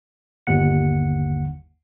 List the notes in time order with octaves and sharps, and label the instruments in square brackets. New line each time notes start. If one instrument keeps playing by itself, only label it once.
[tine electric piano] G1 D#2 F#5 C#7